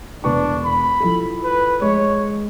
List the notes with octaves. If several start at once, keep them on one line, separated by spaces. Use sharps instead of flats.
E1 D4 B4 C#6
B5
F3 E4 A4
B4
G#3 C#5